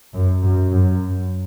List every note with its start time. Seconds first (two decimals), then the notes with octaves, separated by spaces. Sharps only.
0.13 F#2
0.43 F#2
0.73 F#2